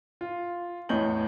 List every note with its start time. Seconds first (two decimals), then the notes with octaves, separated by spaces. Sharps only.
0.21 F4
0.89 E2 A2 C#5 D#5 G6 F#7